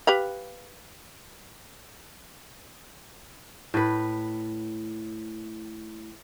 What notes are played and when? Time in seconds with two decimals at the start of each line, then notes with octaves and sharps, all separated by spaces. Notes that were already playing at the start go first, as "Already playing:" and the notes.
0.07 G4 B4 F5
3.74 A2 B4